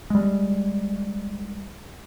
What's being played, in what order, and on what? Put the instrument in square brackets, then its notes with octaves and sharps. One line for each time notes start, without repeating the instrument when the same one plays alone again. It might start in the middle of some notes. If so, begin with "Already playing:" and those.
[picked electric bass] G3 G#3